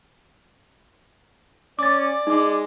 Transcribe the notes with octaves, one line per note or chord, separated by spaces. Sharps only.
C#4 D5 D6 A6
G#3 D#4 D6